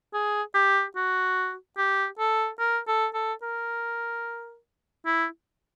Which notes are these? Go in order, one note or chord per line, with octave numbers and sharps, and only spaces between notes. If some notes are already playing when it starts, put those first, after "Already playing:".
G#4
G4
F#4
G4
A4
A#4
A4
A4
A#4
E4